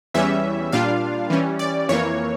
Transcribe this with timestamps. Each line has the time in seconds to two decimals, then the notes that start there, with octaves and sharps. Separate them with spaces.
0.14 E2 E3 G3 C#4 E5
0.72 A#2 G3 D4 F4 F5
1.30 E3 G3 C#4
1.59 D5
1.89 F2 E3 A#3 C#5